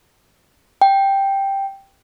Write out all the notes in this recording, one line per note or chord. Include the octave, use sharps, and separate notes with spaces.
G5